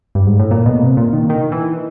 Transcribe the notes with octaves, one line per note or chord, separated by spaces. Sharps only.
G2
G#2
A2
A#2
B2
C3
A#2
D#3
D#3
E3